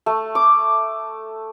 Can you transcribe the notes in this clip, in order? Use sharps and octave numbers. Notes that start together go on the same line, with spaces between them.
A3
D6